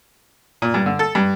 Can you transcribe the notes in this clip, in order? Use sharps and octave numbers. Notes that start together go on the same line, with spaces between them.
A#2
G2
D3
A4
G2